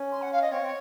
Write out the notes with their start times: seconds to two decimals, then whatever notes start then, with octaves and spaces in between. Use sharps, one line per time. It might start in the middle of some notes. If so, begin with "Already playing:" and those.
Already playing: C#4
0.12 C6
0.22 F#5
0.32 F5
0.42 D#5
0.51 C4 C#5
0.61 C4